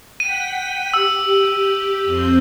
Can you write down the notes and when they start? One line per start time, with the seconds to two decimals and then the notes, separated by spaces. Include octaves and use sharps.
0.20 F#5 G5 B6 D#7
0.94 G4 E6
2.05 F2 C4 G6